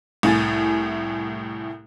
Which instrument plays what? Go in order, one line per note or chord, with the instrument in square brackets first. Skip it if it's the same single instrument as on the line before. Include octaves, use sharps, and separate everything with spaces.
[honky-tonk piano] C2 A2 G#5 A6